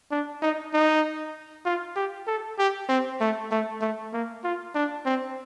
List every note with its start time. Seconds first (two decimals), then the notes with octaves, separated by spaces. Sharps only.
0.11 D4
0.42 D#4
0.73 D#4
1.65 F4
1.96 G4
2.27 A4
2.58 G4
2.89 C4
3.21 A3
3.51 A3
3.81 A3
4.13 A#3
4.44 F4
4.75 D4
5.06 C4